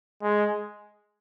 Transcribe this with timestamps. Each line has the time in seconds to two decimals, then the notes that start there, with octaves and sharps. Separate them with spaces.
0.22 G#3